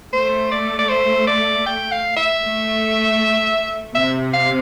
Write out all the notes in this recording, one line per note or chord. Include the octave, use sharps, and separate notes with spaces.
A3 C5
D5
D5
C5
D5
G5
F5
E5
A3
C3 E5
F5